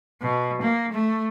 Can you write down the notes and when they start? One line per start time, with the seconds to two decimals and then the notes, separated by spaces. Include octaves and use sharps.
0.22 B2
0.61 A#3
0.92 A3